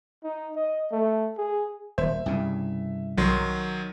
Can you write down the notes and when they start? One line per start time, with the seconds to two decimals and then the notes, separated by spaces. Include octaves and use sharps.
0.24 D#4
0.56 D#5
0.92 A3
1.38 G#4
1.98 D#1 C5 E5
2.26 C2 G2 C#3
3.17 B1 D#3 F#3 C6